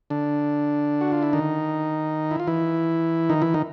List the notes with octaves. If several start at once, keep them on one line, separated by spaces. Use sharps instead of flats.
D3 D4
F#4
F4
E4
D#3 D#4
E4
F4
E3 E4
D#3 D#4
E3 E4
D#3 D#4